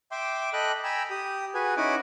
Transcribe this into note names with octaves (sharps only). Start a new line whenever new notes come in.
E5 G5 C6 D6
A4 D#5 G5 B5 D6 F#6
G5 G#5 A#5 B5 E6
G4 D#6
F#4 G#4 B4 G#5
C#4 D#4 E4 F#5 G#5 D6